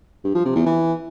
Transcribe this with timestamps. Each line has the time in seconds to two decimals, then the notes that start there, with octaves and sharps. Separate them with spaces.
0.24 G2
0.35 F3
0.45 C3
0.56 E2
0.66 E3